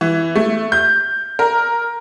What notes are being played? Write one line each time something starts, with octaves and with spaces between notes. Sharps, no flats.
E3
A3
G6
A#4